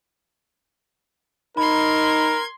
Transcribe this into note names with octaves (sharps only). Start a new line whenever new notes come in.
D#4 A#4 B5 C6 G#6